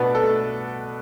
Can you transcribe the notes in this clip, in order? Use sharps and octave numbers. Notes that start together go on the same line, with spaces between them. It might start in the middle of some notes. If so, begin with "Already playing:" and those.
Already playing: B2 A3 B3 D4 B4 D5
A4
A3